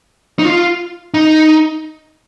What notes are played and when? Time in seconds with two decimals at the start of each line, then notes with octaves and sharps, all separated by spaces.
0.39 D#4
0.45 F4
1.14 D#4